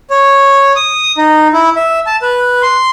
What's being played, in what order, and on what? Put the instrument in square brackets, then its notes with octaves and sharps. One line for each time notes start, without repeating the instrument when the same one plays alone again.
[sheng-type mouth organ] C#5
D#6
D#4
E4
E5
A5
B4
C6